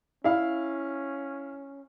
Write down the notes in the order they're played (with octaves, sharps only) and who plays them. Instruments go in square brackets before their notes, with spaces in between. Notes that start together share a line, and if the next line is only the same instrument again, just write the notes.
[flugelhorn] C#4 [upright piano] E4 F5